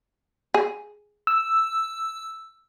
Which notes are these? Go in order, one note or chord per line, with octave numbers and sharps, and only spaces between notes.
G#4
E6